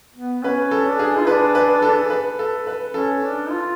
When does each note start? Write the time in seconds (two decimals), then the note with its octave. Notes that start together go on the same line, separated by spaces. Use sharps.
0.16 B3
0.43 C#4 B4
0.71 A4
0.86 D4
0.99 G#4
1.18 F4
1.27 D4 B4
1.55 B4
1.82 A4
2.10 B4
2.39 A4
2.67 B4
2.94 C#4 A4
3.22 D4
3.50 F4